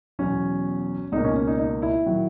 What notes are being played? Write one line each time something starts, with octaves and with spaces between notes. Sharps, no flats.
E2 B2 F#3 C#4
C#2 B2 A#3 D#4
C#4
C#4
D#4
D#4
E4
D#3 F#3